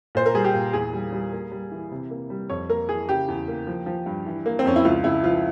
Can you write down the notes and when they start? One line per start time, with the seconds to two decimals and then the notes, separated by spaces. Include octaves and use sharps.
0.15 A#2 C5
0.26 A#4
0.34 G3 G#4
0.44 G4
0.53 A#2
0.73 E2 G#4
0.93 G3
1.12 G3
1.32 A#3
1.52 G3
1.71 E3
1.91 C3
2.11 A#3
2.30 G3
2.50 F2 C#5
2.69 A#3 A#4
2.89 E3 G#4
3.09 C#3 G4
3.28 E2
3.48 A#3
3.67 F3
3.86 F3
4.06 G2
4.26 E3
4.46 A#3
4.59 C4
4.65 F2 C#4
4.76 E4
4.85 C#2 F4
5.04 C#2 E4
5.23 F3 F4